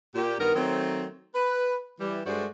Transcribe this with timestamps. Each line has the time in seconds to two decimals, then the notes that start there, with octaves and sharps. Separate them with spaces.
0.14 A#2 G4
0.39 G2 D#3 B3 A#4
0.55 D#3 F#3 A3 C4
1.35 B4
2.00 E3 G3
2.26 G2 G#3 A3 F#4 C5 D5